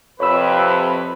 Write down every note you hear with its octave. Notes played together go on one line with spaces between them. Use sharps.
F2 C3 B4 C#5 B5 E6